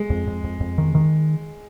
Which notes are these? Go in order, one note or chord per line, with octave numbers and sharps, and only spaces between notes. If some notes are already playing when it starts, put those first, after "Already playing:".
Already playing: G#3
F2
F2
F2
F2
D#3
D#3